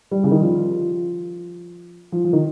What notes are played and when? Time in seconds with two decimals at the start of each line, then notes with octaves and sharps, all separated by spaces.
0.11 G3
0.24 C#3
0.31 D#3
0.40 F3
2.12 F3
2.25 F3
2.33 D#3